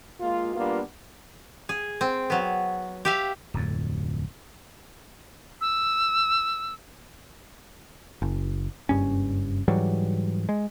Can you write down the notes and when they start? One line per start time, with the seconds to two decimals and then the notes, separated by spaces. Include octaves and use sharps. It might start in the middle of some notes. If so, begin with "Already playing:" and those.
0.21 G#3 A#3 F4
0.56 G3 A#3 B3 D4 F4
1.69 G#4
2.01 C4
2.30 F#3 B3
3.05 G4 E5 F5
3.54 D1 F2
5.61 E6
8.22 F#1
8.89 F#1 G2 C#4
9.68 G#2 E3 F#3 G3
10.49 G#3